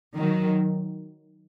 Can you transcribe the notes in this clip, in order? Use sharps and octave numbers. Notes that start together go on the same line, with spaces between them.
D#3 F#3